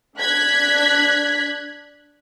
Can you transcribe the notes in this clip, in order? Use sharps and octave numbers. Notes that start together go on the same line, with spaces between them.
D4 F#6 G#6 B6